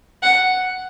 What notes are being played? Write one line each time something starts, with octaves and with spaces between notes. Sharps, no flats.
F#5